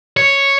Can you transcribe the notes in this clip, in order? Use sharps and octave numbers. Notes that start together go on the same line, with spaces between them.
C#5